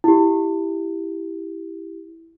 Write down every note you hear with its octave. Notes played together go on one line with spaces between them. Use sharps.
E4 G4